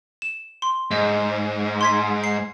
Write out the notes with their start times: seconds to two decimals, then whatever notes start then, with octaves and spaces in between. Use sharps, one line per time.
0.22 E7
0.62 C6
0.91 G#2 D#5
1.81 C6 G#6 B6
2.24 C7